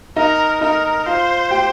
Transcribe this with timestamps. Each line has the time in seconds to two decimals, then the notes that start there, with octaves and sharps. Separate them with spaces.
0.16 D#4 A#4 D#5
0.61 D#4 A#4 D#5
1.06 F4 C5 F5
1.51 G4 G5